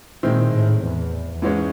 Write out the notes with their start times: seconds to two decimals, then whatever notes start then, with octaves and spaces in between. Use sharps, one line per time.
0.23 A#2 D#3 G#3 C4 E4
0.52 A2
0.82 E2
1.42 G#2 E3 G#3 C#4